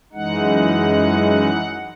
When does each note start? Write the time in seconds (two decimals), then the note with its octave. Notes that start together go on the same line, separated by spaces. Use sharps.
0.13 F#2 E3 G#3 D#4 F#5